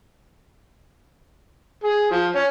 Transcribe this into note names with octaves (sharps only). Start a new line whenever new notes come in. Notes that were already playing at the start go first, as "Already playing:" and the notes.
G#4
F3
C#4